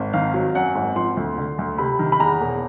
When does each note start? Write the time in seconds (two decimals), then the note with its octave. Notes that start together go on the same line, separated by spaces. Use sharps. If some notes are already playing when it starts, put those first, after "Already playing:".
Already playing: G#1
0.13 D#3 F5
0.34 F#3
0.55 F#2 F#5
0.75 G#1
0.96 F3 C6
1.17 D2
1.38 D3
1.59 D2
1.78 C3 B5
1.99 D#3
2.12 B5
2.20 E2 A#5
2.41 E1